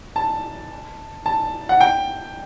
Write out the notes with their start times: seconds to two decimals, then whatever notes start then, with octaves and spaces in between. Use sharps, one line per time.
0.16 A5
1.26 A5
1.69 F#5
1.80 G5